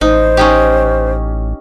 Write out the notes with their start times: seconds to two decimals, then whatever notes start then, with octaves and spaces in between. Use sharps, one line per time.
0.01 A1 D#4 C5
0.37 C#4 D#4 G4